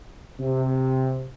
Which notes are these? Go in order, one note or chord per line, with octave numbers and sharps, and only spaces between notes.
C3